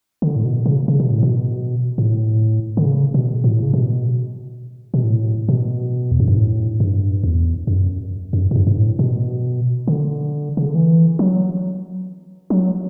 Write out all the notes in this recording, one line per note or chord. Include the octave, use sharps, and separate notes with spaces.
D3
A2
B2
C#3
C#3
B2
A2
B2
A2
D3
C#3
B2
A2
C#3
B2
B2
A2
B2
E2
F#2
G2
A2
G2
E2
F#2
F#2
A2
G2
G2
A2
B2
D3
C#3
D3
E3
F#3
F#3